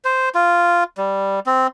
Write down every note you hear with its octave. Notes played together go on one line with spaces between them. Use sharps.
C5
F4
G3
C4